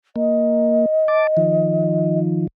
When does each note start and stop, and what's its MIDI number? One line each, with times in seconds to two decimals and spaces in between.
0.16 0.86 58
0.16 2.18 75
1.08 1.27 81
1.08 1.27 86
1.37 2.47 51
1.37 2.47 53